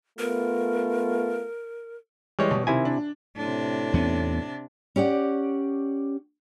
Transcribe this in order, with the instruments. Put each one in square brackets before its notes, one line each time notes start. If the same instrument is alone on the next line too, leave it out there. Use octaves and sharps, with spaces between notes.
[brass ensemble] A3 B3 F4 [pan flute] A#4
[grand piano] E3 G#3 [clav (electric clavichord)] G3 C#5
[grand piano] B2
[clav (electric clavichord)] C3 E4 G#5 [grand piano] D#3
[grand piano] D4
[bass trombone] A2 [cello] C3 D4
[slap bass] E2 B3 C#4
[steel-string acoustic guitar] C#4 G4 D5 F#5